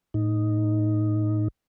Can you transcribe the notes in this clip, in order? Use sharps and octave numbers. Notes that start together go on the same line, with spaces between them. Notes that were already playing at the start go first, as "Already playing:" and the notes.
A2 D#4